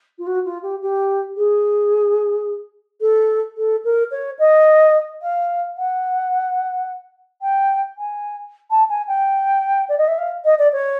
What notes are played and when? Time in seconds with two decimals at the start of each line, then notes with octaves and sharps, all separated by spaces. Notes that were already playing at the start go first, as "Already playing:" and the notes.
0.18 F4
0.27 F#4
0.45 F4
0.62 G4
0.82 G4
1.36 G#4
3.01 A4
3.57 A4
3.84 A#4
4.11 C#5
4.39 D#5
5.22 F5
5.77 F#5
7.42 G5
7.97 G#5
8.71 A5
8.89 G#5
9.07 G5
9.89 D5
9.98 D#5
10.07 E5
10.18 F5
10.44 D#5
10.58 D5
10.72 C#5